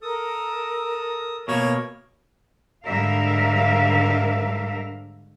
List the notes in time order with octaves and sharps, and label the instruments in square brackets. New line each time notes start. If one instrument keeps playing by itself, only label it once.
[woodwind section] A4 A#4 [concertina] D#6
[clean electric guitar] B2 A#3 [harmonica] C#5
[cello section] G#2 D3 G3 A#4 E5 F5